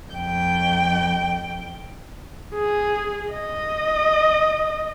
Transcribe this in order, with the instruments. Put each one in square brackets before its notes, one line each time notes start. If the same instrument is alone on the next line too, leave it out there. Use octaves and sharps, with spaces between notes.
[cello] F2 G5
[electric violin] G#4
D#5